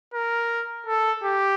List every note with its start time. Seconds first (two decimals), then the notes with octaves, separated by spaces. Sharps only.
0.14 A#4
0.87 A4
1.24 G4